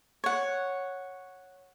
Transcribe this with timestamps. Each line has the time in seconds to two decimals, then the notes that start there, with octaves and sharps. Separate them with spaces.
0.24 C#5 F#5